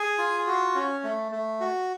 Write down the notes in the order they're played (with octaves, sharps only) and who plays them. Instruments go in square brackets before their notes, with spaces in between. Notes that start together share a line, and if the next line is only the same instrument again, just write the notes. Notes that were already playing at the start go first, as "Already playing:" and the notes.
Already playing: [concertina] G#4 G#5
F4
F#4
C#4
A3
A3
F#4